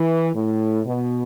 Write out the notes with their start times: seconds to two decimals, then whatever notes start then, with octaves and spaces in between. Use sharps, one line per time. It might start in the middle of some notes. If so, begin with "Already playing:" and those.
Already playing: E3
0.34 A2
0.85 B2